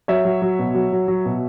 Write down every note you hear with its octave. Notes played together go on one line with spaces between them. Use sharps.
F#3 C#5 E5
F#3
F#3
B2
F#3
F#3
F#3
B2